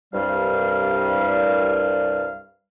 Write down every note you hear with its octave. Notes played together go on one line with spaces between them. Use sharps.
C2 G2 G3 F5